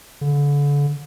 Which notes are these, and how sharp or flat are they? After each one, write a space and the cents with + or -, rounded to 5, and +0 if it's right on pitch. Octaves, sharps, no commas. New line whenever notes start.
D3 -35